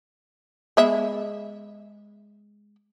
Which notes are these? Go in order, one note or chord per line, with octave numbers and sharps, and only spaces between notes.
G#3 B3 E5